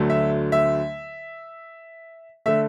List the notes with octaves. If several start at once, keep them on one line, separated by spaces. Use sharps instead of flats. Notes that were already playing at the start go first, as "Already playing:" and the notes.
Already playing: D2 D3 F#3 A3
E5
E5
D3 A3 E5